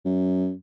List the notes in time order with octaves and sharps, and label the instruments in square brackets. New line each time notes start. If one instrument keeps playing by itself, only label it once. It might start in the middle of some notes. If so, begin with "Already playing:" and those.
[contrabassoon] F#2